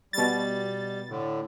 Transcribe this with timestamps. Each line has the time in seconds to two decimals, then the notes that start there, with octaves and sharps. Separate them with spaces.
0.13 B2 G3 A6
1.09 A2 D3